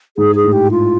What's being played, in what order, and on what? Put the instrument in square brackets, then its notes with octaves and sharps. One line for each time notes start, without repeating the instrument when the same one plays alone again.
[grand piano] G#2 [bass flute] G#4
[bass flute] G#4
[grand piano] A2
[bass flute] G4
F4